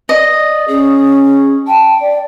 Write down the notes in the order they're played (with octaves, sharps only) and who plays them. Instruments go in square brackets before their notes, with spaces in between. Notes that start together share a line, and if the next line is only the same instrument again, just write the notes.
[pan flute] D5 [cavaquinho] D#5
[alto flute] C#4 [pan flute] G#4
[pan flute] G5 [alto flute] A5
[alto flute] D5